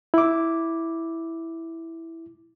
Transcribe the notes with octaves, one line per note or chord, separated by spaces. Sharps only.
E4 D6